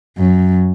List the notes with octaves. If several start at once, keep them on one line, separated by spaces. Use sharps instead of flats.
F#2